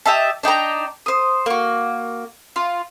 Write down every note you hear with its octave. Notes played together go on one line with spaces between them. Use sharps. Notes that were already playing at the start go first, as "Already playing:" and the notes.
G4 D#5 E5 A5
D4 D#4 G5 A#5
C5 D#6
A#3 F#4
F4